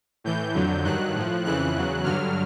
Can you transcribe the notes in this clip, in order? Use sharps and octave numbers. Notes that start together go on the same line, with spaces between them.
A2 E3 G6
F2 D3 F#3
G2 D#3 F#3 F#6
A2 F3
F2 C#3 E3 F#6
E2 C#3 F#3
G2 D3 F#3 F6